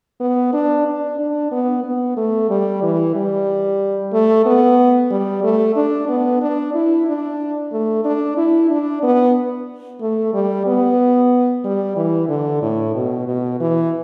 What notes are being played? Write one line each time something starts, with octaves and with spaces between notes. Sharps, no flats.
B3
D4
D4
D4
B3
B3
A3
G3
E3
G3
A3
B3
G3
A3
D4
B3
D4
E4
D4
A3
D4
E4
D4
B3
A3
G3
B3
G3
E3
D3
A2
B2
B2
E3